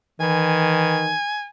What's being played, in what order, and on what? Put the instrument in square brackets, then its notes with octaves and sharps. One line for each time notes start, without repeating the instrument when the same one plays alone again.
[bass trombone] D#3 [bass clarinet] E3 [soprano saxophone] G#5